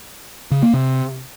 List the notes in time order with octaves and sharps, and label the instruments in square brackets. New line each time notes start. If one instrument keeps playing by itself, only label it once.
[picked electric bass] C#3
A#3
C3